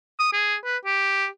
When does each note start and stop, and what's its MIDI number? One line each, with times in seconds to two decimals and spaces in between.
0.19 0.29 87
0.33 0.55 68
0.64 0.77 71
0.85 1.27 67